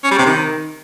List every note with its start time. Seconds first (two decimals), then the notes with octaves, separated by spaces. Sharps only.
0.04 C#4
0.11 G3
0.19 C3
0.26 D#3